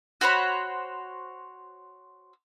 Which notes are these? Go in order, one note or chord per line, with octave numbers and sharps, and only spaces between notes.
F#4 C5 C#5 B5